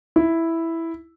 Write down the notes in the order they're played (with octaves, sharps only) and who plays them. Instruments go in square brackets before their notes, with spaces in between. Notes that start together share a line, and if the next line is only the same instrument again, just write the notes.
[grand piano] E4